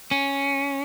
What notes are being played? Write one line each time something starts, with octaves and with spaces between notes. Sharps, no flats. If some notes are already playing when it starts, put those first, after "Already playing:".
C#4